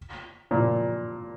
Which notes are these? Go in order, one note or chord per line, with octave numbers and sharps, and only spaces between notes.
A#2